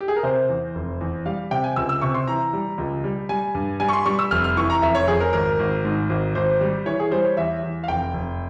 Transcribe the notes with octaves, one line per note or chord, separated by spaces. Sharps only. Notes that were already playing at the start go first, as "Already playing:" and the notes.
G4
G#4
A#4
C3 C5
E2
F1
E2
G3 F5
C3 G5
G#5
C#2 E6
E6
C3 C#6
C6
E3 A#5
G3
C#2
G3
G3 G#5
G2
G3 G#5
C#6
C6
G3 C#6
E6
F1 F6
F6
E3 C#6
A#5
F1 E5
C#5
F2 G#4
A#4
G#1 A#4
G#1
G#2
G#1
G#1 C5
G3
E3 C#5
G#4
G3 C5
C#5
E2 E5
E2
F5
F1 G5
F1